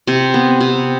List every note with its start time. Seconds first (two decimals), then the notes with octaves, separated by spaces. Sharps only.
0.07 C3
0.34 B3
0.61 C3